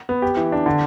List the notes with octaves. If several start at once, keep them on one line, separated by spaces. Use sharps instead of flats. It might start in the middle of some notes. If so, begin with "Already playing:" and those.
B3
G4
E3
D4
D3